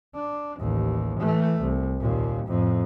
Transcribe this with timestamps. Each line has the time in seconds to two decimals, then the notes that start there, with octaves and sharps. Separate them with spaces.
0.15 D4
0.59 A1 D#2
1.20 E3 A3
1.61 C2
2.00 D#2 A#2
2.47 F2 A2